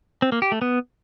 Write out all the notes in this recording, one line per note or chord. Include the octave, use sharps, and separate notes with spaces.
C4
A#3
G4
A3
B3